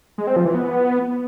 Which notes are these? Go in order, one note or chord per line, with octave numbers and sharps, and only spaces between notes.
G#3
C4
F3
E3
B3